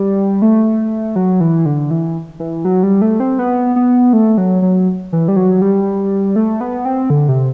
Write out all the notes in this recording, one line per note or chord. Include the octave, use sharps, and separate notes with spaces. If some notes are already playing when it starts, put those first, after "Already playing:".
Already playing: G3
A3
F#3
E3
D3
E3
E3
F#3
G3
A3
C4
B3
B3
A3
F#3
F#3
E3
G3
F#3
G3
A3
B3
C4
D3
C3